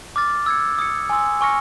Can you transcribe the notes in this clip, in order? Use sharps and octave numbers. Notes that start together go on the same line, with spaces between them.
D6 F6 A6
E6 G#6 C#7
D#6 G#6 C#7
G#5 C6 E6
G#5 C#6 F6 A#6 C#7